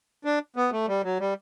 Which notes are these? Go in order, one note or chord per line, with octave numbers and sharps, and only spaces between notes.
D4
B3
A3
G3
F#3
G3